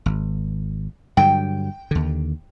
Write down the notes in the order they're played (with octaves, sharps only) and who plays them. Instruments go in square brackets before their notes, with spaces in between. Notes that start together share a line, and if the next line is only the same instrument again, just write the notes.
[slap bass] G#1
[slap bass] G2 D3 F#3 [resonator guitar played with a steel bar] G5
[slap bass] D#2 D3